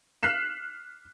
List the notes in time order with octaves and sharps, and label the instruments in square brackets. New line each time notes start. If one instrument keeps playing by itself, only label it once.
[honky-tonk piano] F6 F#6 B6 C7 E7